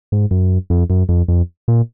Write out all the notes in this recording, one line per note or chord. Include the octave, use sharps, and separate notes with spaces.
G#2
F#2
F2
F#2
F2
F2
A#2